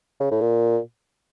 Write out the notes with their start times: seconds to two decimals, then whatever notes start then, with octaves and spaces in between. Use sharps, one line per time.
0.20 C#3
0.31 A2
0.41 A#2